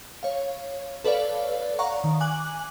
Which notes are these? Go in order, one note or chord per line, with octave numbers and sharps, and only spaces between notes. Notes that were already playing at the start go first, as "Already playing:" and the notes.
C#5 F5
A4 B4 C#5 D5 F5
D5 F5 F#5 A#5 C#6
D#3
G#5 D6 F#6 F#7